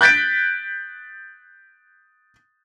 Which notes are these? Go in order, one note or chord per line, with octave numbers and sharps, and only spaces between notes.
F#6 G6 A6 B6 D7